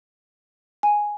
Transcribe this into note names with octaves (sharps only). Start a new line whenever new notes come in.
G#5